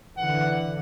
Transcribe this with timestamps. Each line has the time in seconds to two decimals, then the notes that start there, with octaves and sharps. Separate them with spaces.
0.18 D3 E3 F#5